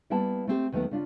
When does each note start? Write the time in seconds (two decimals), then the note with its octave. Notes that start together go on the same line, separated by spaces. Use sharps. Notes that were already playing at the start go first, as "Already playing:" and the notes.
0.10 G3 A#3 B3 E4 G5 A5
0.47 A3 C4 G4
0.72 D#2 D#3 F#3 A3 B3
0.91 C#3 D4 F4